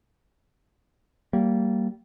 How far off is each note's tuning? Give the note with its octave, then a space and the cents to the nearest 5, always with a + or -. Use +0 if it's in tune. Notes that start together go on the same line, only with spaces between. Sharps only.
G3 -20 A#3 -15